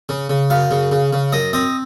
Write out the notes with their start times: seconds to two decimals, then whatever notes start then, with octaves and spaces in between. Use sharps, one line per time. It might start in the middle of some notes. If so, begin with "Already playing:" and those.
0.09 C#3
0.29 C#3
0.50 F#2 F5
0.71 C#3
0.91 C#3
1.13 C#3
1.33 F#2 D#5
1.53 C4 D#5